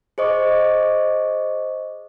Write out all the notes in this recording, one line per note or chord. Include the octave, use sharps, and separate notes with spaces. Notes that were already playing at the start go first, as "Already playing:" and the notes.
G#4 C5 D#5 C#6 D6